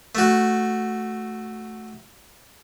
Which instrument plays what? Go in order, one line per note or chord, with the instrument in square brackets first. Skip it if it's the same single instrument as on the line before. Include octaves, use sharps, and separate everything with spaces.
[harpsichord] A3 F#4